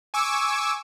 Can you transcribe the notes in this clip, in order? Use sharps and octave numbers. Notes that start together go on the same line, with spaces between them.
G#5 C#6 D6 E6